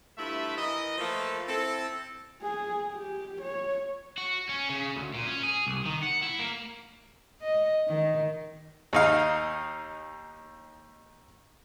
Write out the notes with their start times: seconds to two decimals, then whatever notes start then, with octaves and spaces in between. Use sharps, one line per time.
0.17 G2 A3 E4 F4 E5
0.57 E3 A#4 D#5
0.98 F3 A3 A#3 A4 B4
1.48 C4 E4 A4
2.42 G#4
2.93 G4
3.41 C#5
4.18 F#4
4.49 C#4
4.69 C#3
4.96 D2
5.14 A#2
5.27 C#4
5.43 G#4
5.67 C2
5.86 D#3
6.03 F#5
6.23 E4
6.39 A#3
7.42 D#5
7.88 D#3
8.93 D#2 D#4 F5